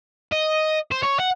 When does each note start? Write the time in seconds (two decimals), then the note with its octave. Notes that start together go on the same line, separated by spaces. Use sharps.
0.32 D#5
0.91 C5
1.03 C#5
1.20 F#5